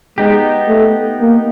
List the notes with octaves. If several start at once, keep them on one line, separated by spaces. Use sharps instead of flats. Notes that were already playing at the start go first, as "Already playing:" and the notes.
G#3 B3 D#4 G4
A3
A#3